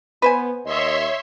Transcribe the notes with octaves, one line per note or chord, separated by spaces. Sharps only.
B3 B4 C5 G#5
D#2 C#5 D#5 E5 C6